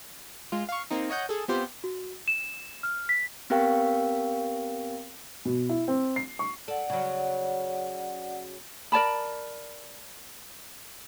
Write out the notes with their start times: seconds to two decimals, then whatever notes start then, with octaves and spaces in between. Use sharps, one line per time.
0.52 G#3 F4
0.69 F5 C#6
0.91 A#3 C4 D#4
1.10 C#5 D#5 F#5 G6
1.29 G#4 A4
1.48 B3 C4 F4 G4 C5
1.84 F#4
2.28 E7
2.83 F6
3.09 B6
3.50 B3 C4 G4 A#4 F5 G5
5.45 B2
5.69 E4
5.88 C4
6.16 C7
6.39 C#6
6.68 A4 D5 F#5
6.90 C#3 F#3
8.92 A#4 D5 A5 B5